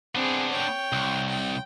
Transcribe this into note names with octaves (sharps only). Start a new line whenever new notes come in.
B3 C4 D4 G#4
C#5 G5
C2
G5